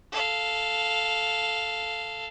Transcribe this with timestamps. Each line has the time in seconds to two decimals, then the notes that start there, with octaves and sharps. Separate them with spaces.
0.12 A4 F5